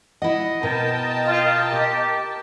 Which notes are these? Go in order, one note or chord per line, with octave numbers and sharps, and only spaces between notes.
E4 D#5 F#5
B2 A#4 G5 A5
F4
G4